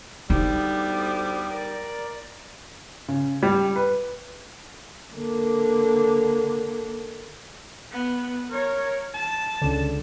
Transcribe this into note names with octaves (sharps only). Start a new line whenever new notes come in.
D2 G3 B3 D#4 D6
A#4 D5
C#3
G3
B4
D3 A#3
B3
A#4 C#5
A5
C#2 D3